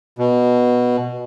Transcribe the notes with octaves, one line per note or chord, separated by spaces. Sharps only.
B2